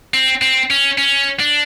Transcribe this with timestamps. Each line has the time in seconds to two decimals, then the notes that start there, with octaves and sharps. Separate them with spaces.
0.14 C4
0.42 C4
0.70 C#4
0.98 C#4
1.40 D4